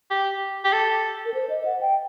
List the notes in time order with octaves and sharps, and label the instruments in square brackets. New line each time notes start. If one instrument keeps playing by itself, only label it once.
[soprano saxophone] G4
G4
A4
[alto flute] A#4
C5
D#5
F#5
G5